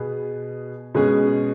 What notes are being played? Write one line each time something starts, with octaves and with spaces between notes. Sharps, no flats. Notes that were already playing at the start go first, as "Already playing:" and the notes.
Already playing: B2 B3 G#4 B4
B2 G#3 C#4 G#4